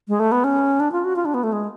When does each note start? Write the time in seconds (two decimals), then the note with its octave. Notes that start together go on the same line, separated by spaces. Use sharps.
0.08 G#3
0.20 A3
0.32 B3
0.44 C#4
0.80 D4
0.92 F4
1.05 F#4
1.16 F4
1.25 D4
1.34 B3
1.43 A3
1.52 G#3